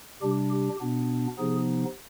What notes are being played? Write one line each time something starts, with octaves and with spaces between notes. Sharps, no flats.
C3 G3 D4 G4
G4
B2 B3 D4
C3 F3 B3 D#4 G#4